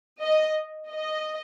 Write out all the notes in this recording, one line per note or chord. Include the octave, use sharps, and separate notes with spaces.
D#5
D#5